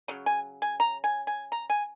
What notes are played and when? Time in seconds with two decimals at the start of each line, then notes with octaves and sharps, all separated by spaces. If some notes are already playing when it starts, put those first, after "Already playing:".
0.08 C#3 F#3
0.26 G#5
0.62 G#5
0.80 A#5
1.04 G#5
1.27 G#5
1.52 A#5
1.70 G#5